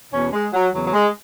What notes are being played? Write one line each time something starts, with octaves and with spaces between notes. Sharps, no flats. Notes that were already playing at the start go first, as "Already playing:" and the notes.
E2 B2 C#4
G#3
F#3
E2 C#3 E3 F#3
F#3
G#3